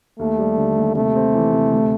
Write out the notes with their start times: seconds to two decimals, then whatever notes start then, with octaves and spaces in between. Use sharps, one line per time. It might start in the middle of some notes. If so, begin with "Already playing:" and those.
0.19 D#2 A3
0.39 G3
0.57 D3
0.77 D#2
0.96 C3 A3
1.15 C4
1.35 E3
1.53 C3
1.72 D2